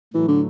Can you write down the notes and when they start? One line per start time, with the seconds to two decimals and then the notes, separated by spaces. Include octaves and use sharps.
0.13 A2 E3 F#3 A3
0.28 D3